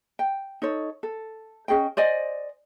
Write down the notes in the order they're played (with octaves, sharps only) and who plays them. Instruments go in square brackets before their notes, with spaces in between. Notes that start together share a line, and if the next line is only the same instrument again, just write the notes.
[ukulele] G5
D#4 A4 C#5
A4
C#4 G#4 D#5 G5
C5 D5 D#5 G#5